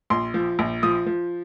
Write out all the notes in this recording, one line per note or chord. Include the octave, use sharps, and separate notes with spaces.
A#1 C6
F3
A#1
F3 D#6
F3